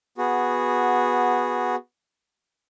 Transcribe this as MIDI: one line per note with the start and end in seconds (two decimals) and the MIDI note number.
0.18 1.75 59
0.18 1.75 66
0.18 1.75 68